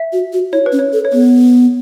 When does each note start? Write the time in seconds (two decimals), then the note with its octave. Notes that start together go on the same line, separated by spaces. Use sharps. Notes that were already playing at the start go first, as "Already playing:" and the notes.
Already playing: E5
0.13 F#4
0.33 F#4
0.52 E4 C#5
0.66 B4
0.72 C#4
0.79 C#5
0.93 A4
1.05 C#5
1.12 B3 B4